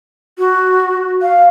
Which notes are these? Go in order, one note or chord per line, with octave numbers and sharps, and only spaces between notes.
F#4
F5